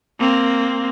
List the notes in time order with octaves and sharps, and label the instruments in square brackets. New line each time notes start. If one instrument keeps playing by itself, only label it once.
[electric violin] A#3 C4